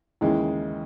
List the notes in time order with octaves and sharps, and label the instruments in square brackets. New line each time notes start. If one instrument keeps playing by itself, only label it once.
[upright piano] D#2 C#3 E3 G#3